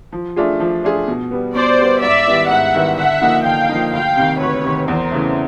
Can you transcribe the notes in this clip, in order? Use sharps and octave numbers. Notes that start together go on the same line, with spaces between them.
F3
A3 D4 F4 G#4
F3
A3 D4 F4 G#4
B2
G3 B3
B2 C5 D5
G3 B3
G#2 D5 E5
D#3 G3 B3 E4
G#2 E5 F#5
D#3 G3 B3 E4
D3 E5 F#5
F3 A#3 D#4
D3 F5 G5
F3 A#3 D#4
D2 F5 G5
C3 D#3
D2 B4 C#5
C3 D#3
E2 A#4 C5
C#3 E3 A3